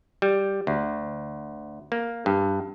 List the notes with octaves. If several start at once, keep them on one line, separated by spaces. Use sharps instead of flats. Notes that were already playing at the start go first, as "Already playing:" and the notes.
G3
D2
A#3
G2